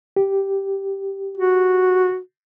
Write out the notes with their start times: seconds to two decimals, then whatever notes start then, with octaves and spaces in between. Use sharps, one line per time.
0.16 G4
1.38 F#4